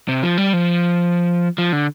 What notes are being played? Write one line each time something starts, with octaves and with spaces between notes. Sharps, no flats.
C3
F3
G3
F3
F3
D3